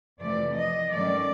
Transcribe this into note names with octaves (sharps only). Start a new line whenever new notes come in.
F2 C3 E3 A3 D5
D#5
G2 D#3 F#3 A3 C#4 D5